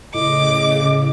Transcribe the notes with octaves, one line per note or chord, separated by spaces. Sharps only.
A2 C#3 D#5 D6